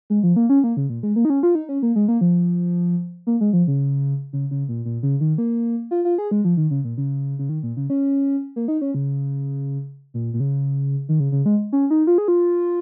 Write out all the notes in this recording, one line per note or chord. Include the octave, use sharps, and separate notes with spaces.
G#3
F3
A#3
C#4
A#3
C#3
A#2
G#3
A#3
D#4
C#4
F4
D#4
C#4
A#3
G#3
A#3
F3
A#3
G#3
F3
C#3
C#3
C#3
A#2
A#2
C#3
D#3
A#3
F4
F4
G#4
G#3
F3
D#3
C#3
A#2
C#3
C#3
D#3
A#2
C#3
C#4
A#3
D#4
C#4
C#3
A#2
A#2
C#3
D#3
C#3
C#3
G#3
C#4
D#4
F4
G#4
F4